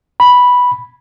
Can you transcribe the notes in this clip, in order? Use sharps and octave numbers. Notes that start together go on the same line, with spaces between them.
B5